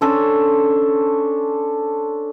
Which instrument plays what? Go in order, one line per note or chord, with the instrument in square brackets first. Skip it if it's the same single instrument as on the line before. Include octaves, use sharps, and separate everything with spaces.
[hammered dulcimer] C#4 D4 A4 C5